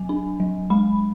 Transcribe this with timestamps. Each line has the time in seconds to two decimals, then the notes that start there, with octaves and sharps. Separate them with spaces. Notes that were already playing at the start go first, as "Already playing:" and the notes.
Already playing: F#3 G#5
0.09 D4
0.40 F#3
0.70 G#3 B5